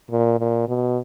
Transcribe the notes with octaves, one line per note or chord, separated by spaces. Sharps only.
A#2
A#2
B2